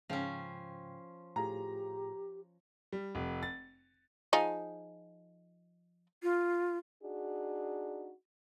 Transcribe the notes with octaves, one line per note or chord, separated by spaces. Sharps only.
G#2 C#3 F3 C#4 G5
A2 F4 G4 G#4 A#5
G3
F1
A6
F3 D#4 G#4
F4
D4 D#4 F#4 G#4